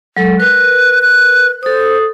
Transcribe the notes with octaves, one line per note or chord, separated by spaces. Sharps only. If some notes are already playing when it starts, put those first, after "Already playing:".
F#3 G#3 A4
A#4 B4 F#6
F#6
A4 C5 D#6